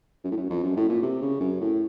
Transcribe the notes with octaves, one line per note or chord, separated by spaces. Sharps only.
F#2
A2
F#2
F2
F#2
A2
A#2
C3
C#3
F#2
A2